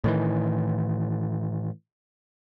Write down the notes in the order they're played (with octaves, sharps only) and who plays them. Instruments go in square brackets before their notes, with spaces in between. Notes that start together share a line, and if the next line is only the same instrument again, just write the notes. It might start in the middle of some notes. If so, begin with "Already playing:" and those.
[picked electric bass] A2 D#3 E3